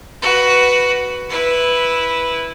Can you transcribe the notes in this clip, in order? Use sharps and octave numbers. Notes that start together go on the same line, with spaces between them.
F#4 B4
E4 B4